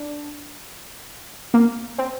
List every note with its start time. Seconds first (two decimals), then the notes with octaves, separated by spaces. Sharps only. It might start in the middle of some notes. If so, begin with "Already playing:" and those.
Already playing: D4
1.54 A#3
1.98 C4